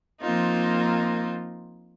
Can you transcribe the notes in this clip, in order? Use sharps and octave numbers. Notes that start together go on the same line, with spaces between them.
F3 A#3 C4 D#4 F4